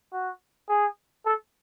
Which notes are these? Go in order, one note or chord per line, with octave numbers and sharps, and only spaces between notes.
F#4
G#4
A4